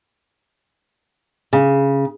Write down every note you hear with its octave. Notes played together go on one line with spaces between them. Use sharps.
C#3